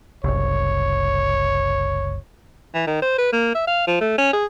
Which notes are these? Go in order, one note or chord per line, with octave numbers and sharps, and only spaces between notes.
F#1 C2 C#5
E3
D#3
C5
B4
A#3
E5
F5
F3
A3
C#4
G#4